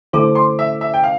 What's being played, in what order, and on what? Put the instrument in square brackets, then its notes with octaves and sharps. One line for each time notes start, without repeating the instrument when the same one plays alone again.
[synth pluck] D3 A3 E4 A4 C5 [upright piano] D6
[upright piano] C6
E5
E5
G5
F5